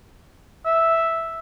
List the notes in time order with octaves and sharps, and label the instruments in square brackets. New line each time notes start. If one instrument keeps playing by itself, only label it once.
[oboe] E5